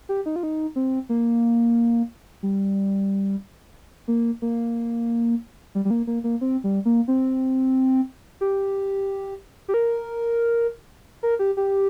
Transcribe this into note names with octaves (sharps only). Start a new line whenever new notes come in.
G4
D#4
F4
D#4
C4
A#3
G3
A#3
A#3
G3
G3
A#3
A#3
A#3
C4
G3
A#3
C4
G4
G4
A#4
A#4
G4
G4